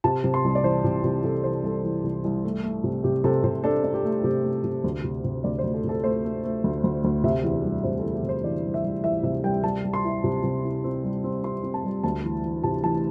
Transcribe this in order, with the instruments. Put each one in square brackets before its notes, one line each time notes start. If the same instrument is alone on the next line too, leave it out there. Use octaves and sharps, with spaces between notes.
[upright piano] C3 A5
C3
C6
C2
D5
E3 C5
C3
C3
C3 A4
E3 C5
C2 A4
E3
C2
C2
A3
A3
C3
C3 G4
C3 A4
C3 C5
D4 A4
D4
G4
A3
C3 G4
A3
C3
D2
C3
C3
D2 D5
C5
D2
A4
C3
A4
A3 C5
A3
A3
D2
D2
D2
C3 E5
E2
G3
C3 C5
A4
E2
G4
C3
C5
E3 D5
G3
E5
G3
E3 E5
C3 E5
G3 G5
G3 A5
G3
C6
E4
C3
C3
E4
C4
G3
C4
C4 C6
C4
A5
G3
D2 A5
E3
E3
C3 A5
E3 A5